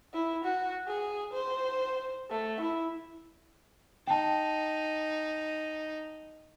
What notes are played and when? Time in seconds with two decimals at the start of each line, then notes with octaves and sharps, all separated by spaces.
0.14 E4
0.44 F#4
0.87 G#4
1.33 C5
2.31 A3
2.60 E4
4.07 D#4 G5 A5